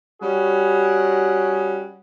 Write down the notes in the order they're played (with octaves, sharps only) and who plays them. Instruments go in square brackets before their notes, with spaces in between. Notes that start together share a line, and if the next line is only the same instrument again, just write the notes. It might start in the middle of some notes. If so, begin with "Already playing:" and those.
[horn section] G3 C#4 F#4 G#4